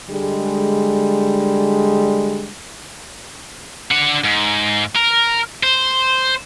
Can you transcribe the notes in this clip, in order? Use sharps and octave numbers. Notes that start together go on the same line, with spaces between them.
D3 G3 G#3
D4 F#5
G#2
A#4
C5